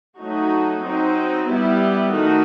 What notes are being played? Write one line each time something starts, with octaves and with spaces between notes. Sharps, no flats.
F#3 A3 D#4 F#4
F#3 C4 D#4
G3 B3 E4 G4
D#3 A3 D#4 F#4